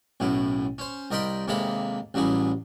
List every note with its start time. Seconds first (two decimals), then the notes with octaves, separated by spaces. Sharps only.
0.20 B1 F#2 A2 E4
0.78 C#4 C5
1.11 C2 A#4 D#5 G5 B5 C6
1.48 D#2 C3 G#3 A#3 A4 B5
2.14 A1 F#3 G3 E4 G#4